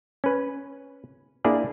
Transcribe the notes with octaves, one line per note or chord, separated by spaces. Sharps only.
C#4 B4
A#3 D4 E4 G#4 D5